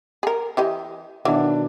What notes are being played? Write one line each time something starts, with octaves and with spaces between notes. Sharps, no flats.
G#4 A#4
E3 G4 D#5
B2 D#3 E3 F#3 D4